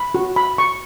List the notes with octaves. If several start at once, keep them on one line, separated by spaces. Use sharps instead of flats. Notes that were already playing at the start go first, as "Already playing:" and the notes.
Already playing: B5
F#4
B5
C#6